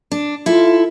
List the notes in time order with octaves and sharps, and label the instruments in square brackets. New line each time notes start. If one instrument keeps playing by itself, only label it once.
[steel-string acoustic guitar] D4
[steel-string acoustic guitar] E4 A4 [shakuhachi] F4